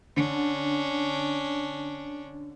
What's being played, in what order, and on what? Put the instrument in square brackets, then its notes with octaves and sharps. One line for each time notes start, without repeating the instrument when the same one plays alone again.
[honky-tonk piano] D3 [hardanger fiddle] C#4 D4